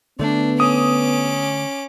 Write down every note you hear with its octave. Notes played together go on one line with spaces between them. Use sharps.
D3 A3 B3 D4
C#4 D6 D#6